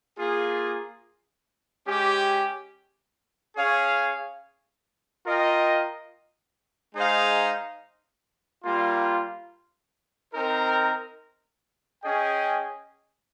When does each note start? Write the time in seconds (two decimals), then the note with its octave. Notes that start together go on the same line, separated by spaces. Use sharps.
0.18 A#3 F4 G#4
1.87 G#3 C#4 G4
3.57 C#4 G#4 C#5 F5
5.26 F4 A#4 D#5 G5
6.95 G#3 D#4 G#4 C5 F5
8.65 G3 A#3 F4
10.34 C4 D#4 A#4
12.03 C#4 G#4 D#5 G5